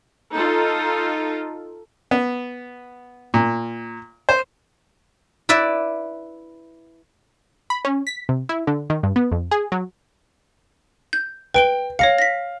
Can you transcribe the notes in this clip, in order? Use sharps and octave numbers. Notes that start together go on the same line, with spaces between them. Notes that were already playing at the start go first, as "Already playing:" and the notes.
D#4 F4 A4
B3
A#2
C5
E4 B4 D5 E5
B5
C#4
B6
C3
E4
D3
D#3
G2
B3
F2
G#4
F#3
G6
B4 G5 D7 G7
C#5 F5 A#6 C#7
A#6 B6